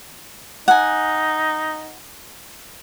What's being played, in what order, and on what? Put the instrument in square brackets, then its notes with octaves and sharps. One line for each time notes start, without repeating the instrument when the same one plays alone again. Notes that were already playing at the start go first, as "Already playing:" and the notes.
[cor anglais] D#4 [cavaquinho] F#5 G#5